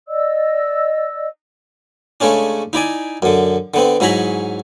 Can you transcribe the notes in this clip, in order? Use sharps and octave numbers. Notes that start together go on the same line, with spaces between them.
D5 D#5 E6
C#3 G#3 A3 C#4 D4
D#4 E4 D5 G#5
F#2 D3
D3 B3 C4
G#2 F#3 E4 G#4 A#5 B5